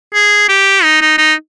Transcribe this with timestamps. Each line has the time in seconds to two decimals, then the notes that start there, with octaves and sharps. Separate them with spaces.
0.14 G#4
0.49 G4
0.83 D#4
1.01 D#4
1.18 D#4